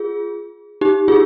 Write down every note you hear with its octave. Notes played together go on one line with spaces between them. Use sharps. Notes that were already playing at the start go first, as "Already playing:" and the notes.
Already playing: F4 G#4
D#4 G4
F4 G#4